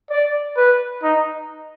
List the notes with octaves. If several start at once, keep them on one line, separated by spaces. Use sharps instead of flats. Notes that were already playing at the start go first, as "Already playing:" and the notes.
D5
B4
D#4